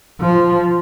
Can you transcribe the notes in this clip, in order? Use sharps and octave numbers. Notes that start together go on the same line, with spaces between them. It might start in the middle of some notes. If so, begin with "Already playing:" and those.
F3